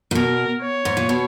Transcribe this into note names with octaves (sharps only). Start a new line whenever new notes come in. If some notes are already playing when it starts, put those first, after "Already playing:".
A#2
B2 A#4
C#5
G#2
A#2
B2